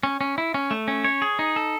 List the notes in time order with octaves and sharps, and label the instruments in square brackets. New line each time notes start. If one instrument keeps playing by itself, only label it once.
[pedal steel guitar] C#4
C#4
E4
C#4
A3
C#4
C#5
G#4
D#4
A4